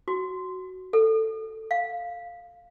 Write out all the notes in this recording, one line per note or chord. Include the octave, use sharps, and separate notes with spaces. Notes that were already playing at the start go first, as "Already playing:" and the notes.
F#4
A4
F5